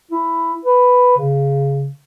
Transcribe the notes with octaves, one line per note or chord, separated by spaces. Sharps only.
E4
B4
C#3